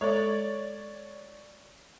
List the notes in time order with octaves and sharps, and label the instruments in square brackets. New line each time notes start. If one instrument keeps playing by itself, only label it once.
[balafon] G#3 A4 [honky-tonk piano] C#5 D5